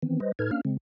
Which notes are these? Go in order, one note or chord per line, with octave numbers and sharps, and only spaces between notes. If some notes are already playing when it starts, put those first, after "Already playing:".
D#3 E3 B3 C4
G3 B4 C5 D#5
A2 D#4 A4 B4 F6 G#6
A#3 C#4 D4 F5 F6
C#3 G#3 C4